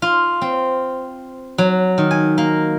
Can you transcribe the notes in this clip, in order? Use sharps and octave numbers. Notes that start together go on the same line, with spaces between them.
F4
C4
F#3
D#3
G#5
A#3